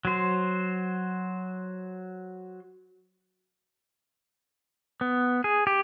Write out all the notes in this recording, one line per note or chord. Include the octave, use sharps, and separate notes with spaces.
F#3 C5
B3
G#4
G4